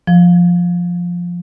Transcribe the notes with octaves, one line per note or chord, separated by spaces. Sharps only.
F3